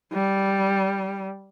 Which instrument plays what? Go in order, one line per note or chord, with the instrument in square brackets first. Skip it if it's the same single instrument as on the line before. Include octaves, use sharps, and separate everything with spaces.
[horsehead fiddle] G3